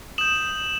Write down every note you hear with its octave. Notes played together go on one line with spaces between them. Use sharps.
D#6 G6 E7 F#7